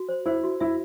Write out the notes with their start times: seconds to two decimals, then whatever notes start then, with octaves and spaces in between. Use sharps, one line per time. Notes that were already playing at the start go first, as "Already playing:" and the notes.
Already playing: F#4
0.09 C5
0.26 E4 C5
0.44 F#4
0.60 E4 E5